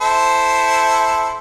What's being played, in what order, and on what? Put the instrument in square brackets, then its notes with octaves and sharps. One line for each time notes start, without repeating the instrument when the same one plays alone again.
[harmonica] E4 A4 C5